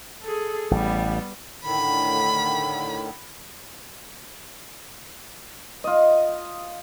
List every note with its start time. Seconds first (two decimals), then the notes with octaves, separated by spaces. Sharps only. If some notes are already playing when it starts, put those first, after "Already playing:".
0.22 G#4 A4
0.71 A1 G3 B3
1.64 A2 D3 D#3 B5
5.84 F4 D#5